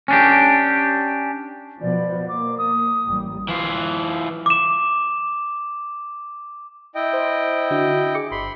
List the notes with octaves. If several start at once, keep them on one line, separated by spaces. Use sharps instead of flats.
C#4 D4 G4
B2 F3 B3 D5
A#3 D6
D#6
A1 G3
E3 F4
D6 E7
E4 D#5 G5
C5
D3 D4 F#4
G#4 D6 C#7
G1 B5 C6